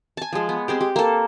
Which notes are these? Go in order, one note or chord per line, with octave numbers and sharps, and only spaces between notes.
G#5 A5
F3 G#3
B3
G#3 C4 G4
G4
A#3 A4